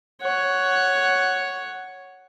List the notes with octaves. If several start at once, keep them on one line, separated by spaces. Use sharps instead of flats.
C#5 F#5